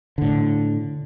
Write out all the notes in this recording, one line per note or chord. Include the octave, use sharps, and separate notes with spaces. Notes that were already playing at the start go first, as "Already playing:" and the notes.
A2 D3